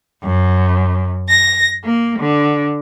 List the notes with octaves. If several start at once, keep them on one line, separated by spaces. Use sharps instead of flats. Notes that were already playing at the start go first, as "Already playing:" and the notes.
F#2
A#6
A#3
D3